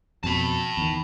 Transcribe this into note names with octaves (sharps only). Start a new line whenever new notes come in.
F2 B2 A5 B5
E2 D#3